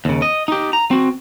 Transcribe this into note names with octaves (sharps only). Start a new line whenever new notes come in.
D#2 C#3
D#5
D#4 G4
A#5
C4 F#4